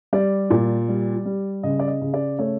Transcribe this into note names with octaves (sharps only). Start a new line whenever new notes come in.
G3 D5
A#2
G3
G3
C#3 D#5
D5
D#5
C#3
D5
A3 C#5